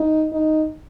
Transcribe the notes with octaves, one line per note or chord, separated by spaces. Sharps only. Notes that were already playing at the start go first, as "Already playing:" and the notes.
Already playing: D#4
D#4